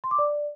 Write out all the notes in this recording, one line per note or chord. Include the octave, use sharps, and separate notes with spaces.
C6
D6
D5